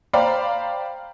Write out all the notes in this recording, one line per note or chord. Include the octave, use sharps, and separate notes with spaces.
C5 D5 F5 G5 A#5 B5